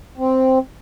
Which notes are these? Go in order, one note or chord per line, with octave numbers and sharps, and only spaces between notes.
C4